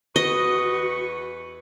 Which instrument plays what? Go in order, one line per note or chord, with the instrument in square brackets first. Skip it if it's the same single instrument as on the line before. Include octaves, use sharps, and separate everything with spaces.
[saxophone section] E2 B4 [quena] F#4 [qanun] D#5 [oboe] C#6